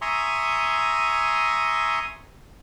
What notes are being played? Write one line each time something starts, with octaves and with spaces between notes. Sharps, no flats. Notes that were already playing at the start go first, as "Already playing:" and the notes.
E5 G#5 A#5 C6 C#6 D#6